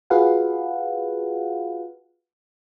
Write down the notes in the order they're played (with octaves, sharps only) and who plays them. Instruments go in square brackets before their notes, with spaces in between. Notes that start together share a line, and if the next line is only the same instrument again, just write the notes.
[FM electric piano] F4 F#4 G#4 B4 F5 F#5